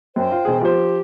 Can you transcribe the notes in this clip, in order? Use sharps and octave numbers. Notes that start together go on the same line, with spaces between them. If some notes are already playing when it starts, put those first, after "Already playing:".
F#2 C5 G5
F4
E1 G#4
F3 G4 C5